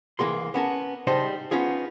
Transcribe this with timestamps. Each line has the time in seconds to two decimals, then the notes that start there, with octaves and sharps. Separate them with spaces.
0.19 C2 E3 A#3 G#4 C6
0.54 B3 C#4 A#4 A5
1.07 C#3 G3 D#4 C5 D#5 A5
1.51 B3 C#4 D#4 F4 G#4